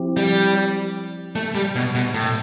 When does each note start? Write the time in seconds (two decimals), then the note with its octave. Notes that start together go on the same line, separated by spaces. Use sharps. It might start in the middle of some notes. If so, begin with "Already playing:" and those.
Already playing: F3 C4 E4 G4
0.17 G3
1.35 A3
1.55 G3
1.75 B2
1.95 B2
2.14 A2